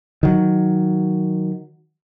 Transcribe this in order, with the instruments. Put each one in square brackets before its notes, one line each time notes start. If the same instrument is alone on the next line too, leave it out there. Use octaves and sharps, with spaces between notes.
[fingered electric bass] D#3 F#3